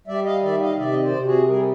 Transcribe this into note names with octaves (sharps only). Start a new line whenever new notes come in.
G3 D5 E5
D#5 F5
D#3 D5 E5
D#5 F5
C3 D5 E5
D#5
C5 D5
C3
F#4 G#4
G3 G#4 A#4